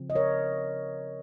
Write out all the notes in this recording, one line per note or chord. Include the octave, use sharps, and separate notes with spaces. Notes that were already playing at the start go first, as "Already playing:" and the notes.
Already playing: C#3 F3 C4
D#5
A#4 C#5